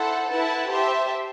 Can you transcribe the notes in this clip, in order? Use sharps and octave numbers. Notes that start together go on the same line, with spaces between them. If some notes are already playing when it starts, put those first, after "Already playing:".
Already playing: E4 A4 C5 F#5 A5
E4 B4 F#5 A5
G4 C5 E5 A5